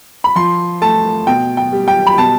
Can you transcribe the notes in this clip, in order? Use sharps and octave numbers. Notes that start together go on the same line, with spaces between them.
B5
F3 C6
A3 A5
B2 G5
G5
G3
G5
B5
B2 A5